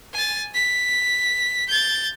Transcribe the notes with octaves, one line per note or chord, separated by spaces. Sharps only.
G#5 A6
B6
G6 A6